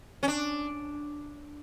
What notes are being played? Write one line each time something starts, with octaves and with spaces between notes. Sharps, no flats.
C#4
D4